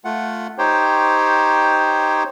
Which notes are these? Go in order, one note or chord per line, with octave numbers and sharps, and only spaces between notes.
A3 F4 F#5
D#4 G4 C5 C#5 G5